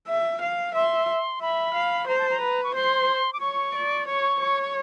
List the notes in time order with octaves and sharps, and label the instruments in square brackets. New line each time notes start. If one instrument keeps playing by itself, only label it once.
[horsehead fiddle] E5
F5
[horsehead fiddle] E5 [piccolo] C6
[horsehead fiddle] E5 [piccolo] B5
[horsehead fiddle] F5
[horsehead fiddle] C5 [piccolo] A#5
[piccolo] A5
A#5
[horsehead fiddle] B4
[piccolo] C#6
[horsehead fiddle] C5 [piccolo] C6
[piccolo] D6
[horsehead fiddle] C#5 [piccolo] C#6
[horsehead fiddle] D5
[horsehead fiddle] C#5 [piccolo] C#6
[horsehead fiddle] C#5
[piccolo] C#6